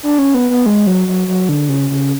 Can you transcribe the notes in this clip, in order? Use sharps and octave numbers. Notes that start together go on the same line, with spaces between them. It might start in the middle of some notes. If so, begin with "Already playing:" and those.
D4
C#4
B3
B3
G#3
F#3
F#3
F#3
D3
C#3
C#3